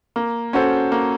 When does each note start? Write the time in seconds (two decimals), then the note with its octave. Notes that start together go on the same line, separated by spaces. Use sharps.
0.16 A#3
0.53 C#4 F#4 A4 C5
0.92 A#3